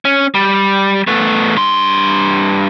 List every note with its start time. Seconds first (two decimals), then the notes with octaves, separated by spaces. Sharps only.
0.05 C#4
0.35 G3
1.07 A3 B3
1.56 G2 C6